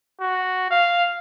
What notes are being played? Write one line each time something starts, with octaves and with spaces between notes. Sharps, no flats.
F#4
F5